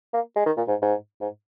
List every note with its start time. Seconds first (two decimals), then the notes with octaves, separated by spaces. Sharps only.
0.14 A#3
0.36 G#3
0.46 D#3
0.57 A#2
0.68 G#2
0.82 G#2
1.21 G#2